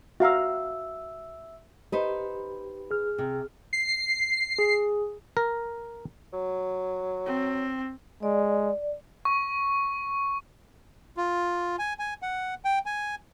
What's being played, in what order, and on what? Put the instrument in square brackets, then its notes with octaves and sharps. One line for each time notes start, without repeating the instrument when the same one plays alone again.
[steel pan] F#4 F5 A#5 [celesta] E5 E6
[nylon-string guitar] D#4 B4 C5 [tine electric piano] G4
[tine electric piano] G#4 F6
[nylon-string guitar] C3
[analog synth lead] C7
[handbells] G#4
[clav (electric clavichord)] A#4
[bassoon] F#3
[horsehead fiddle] C4
[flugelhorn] G#3 [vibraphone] D5
[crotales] C#6
[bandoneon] F4
G#5
G#5
F#5
G5
G#5